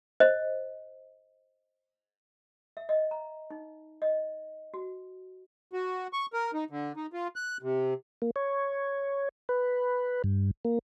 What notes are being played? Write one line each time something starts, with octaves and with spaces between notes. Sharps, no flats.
C5 D#5
E5
D#5
A#5
D#4
D#5
F#4
F#4
C#6
A#4
D#4
D3
D#4
F4
F#6
C3
A#3
C#5
B4
G2
A#3